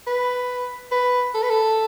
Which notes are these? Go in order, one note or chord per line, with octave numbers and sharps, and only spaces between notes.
B4
B4
A4
B4
A4